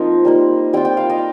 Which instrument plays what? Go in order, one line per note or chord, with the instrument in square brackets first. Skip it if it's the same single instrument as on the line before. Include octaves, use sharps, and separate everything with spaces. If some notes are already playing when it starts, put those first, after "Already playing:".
Already playing: [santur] F3 A#3 C4 D#4 F4 C5 D#5
G3 A#3 D#4
G3 C4 F4 G5
G5
F5
D#5